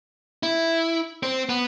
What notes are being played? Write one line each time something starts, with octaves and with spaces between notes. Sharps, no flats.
E4
C4
B3